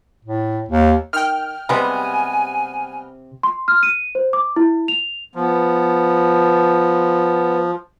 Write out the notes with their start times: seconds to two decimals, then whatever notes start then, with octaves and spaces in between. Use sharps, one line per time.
0.25 A2
0.69 D#2
1.13 D#3 G5 F6
1.69 C3 G3 G#3 B3 G#5
3.43 C6
3.68 F6
3.83 D#7
4.15 C5
4.33 D6
4.56 E4
4.88 F7
5.35 F3 B3